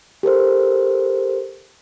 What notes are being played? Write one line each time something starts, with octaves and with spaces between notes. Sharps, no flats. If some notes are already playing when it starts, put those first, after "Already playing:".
G4 A4 A#4 C5